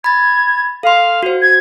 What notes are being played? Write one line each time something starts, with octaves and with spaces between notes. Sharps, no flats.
B5 G#6 A6
A4 F5 C6
F#4 C5
G#6